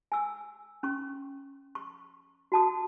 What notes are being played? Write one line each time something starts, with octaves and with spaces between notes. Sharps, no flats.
G#5 E6
C#4 C#6
C#6
F#4 A5 D#6